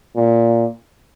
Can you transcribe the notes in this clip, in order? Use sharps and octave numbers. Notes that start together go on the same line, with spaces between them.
A#2